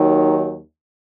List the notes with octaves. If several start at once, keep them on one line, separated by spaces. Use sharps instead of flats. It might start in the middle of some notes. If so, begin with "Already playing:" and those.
Already playing: D#2 D#3 F#3